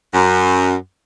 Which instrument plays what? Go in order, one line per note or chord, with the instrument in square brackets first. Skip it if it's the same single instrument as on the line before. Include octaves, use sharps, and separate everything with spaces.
[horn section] F#2